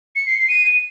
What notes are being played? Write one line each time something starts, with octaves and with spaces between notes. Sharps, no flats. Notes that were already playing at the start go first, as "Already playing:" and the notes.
C#7
C7
C7
D#7